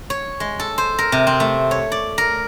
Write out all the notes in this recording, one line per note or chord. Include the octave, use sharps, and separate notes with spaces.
C#5
G#3
A4
C5
A#4
C3
C4
A3
C#5
D5
A#4